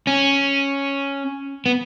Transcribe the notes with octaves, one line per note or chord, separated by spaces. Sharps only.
C#4
B3